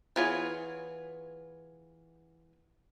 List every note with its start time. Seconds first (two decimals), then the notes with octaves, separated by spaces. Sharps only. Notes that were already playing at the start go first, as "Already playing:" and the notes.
0.16 E3 B3 F4 G#4 C#5